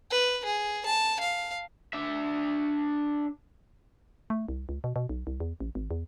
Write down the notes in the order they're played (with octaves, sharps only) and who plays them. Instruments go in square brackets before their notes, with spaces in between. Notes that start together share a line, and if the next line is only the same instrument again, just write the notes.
[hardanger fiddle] B4
G#4
A5
F5
[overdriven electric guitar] D4 E5
[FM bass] A3
C2
C#2
B2
B2
B1
C2
E2
A1
G#1
E2